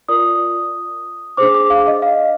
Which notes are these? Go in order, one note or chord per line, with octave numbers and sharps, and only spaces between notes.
F4 A#4 D5 D#6
D4 G#4 C5 D6
D6
F5
D#5
F5